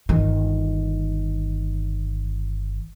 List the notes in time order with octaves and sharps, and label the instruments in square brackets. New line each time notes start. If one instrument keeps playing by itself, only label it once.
[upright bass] G1 D#3